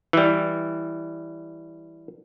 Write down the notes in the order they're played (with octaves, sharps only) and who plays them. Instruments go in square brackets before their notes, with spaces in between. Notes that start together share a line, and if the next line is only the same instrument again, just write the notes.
[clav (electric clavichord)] E3 G3